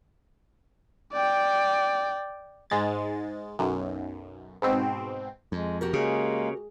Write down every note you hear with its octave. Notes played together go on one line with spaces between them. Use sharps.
D5 G5
G#2 G#3 A6
B1 F#2
G#2 B2 C4
F2 G#3
F#4 G4 A#4
C#3 G#3 A#3 G#4